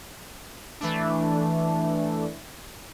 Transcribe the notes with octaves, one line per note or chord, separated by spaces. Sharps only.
E3 A3 D4